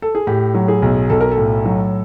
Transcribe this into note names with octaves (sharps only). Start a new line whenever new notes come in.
A4
G#4
A2 G4
F#3
G#4
B1
B1 A4
A#4
A4
A2
F#3